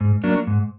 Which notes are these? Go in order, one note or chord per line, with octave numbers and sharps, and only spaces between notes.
G#2
F#3 A#3 D4
G#2